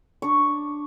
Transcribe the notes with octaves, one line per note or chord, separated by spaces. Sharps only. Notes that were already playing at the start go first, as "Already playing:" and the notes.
D4 C#6